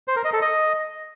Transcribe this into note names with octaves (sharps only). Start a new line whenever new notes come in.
C5
A#4
D#5
A4
D#5